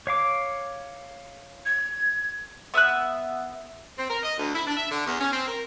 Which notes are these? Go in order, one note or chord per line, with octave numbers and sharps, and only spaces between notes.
C#5 F5 D6
G#6
B3 E5 D#6 F#6
C4
A#4
D#5
D2
E4
D4
E5
D3
E2
C#4
C4
A#4